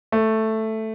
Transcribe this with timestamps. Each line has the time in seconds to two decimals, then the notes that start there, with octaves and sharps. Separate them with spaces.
0.12 A3